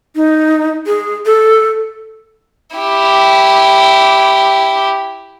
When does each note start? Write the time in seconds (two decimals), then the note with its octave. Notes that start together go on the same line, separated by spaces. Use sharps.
0.16 D#4
0.87 G#4
1.26 A4
2.76 E4 G4